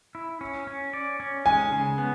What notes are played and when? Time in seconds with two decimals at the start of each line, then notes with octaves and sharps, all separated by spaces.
0.15 E4
0.41 C#4
0.67 C#4
0.93 D5
1.20 C#4
1.46 G#3 G#5
1.72 C#3
1.98 B3